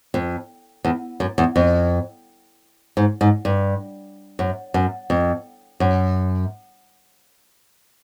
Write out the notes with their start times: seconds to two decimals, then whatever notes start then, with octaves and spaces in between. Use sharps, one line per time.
0.14 F2
0.85 E2
1.20 F#2
1.38 E2
1.56 F2
2.97 G#2
3.21 G#2
3.45 G2
4.39 F#2
4.74 F#2
5.10 F2
5.80 F#2